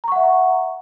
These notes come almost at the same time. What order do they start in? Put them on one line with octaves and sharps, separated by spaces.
A#5 C#6 F#5 E5